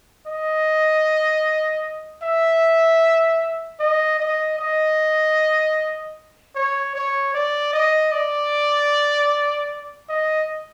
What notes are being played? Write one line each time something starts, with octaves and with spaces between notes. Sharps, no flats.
D#5
E5
D#5
D#5
D#5
C#5
C#5
D5
D#5
D5
D#5